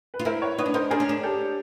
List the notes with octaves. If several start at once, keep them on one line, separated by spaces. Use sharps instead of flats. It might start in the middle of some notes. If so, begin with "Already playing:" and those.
B4
F4
E4 A#4 C5
B4 C#5
D#4 B4 C#5
D4
D#4 A#4 C5
D4 G#4 A#4
C#4
D4
G4 A4